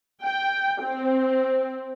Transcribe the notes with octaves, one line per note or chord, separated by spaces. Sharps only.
G5
C4